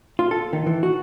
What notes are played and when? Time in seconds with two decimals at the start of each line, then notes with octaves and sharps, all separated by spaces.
0.19 F4
0.31 A4
0.53 D#3
0.66 E3
0.83 F#4